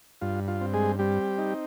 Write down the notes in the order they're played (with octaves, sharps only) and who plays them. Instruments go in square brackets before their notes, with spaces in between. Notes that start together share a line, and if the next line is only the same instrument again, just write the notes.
[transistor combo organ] G2 F4
F4
C4
G#3 G#4
G3 C4 G4
D#4